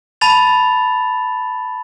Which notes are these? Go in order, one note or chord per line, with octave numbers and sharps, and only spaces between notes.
A5 B5 A6 F7